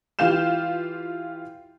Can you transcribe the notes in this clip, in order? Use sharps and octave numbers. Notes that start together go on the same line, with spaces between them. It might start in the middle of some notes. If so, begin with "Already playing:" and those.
E3 F4 G4 F5 G6 E7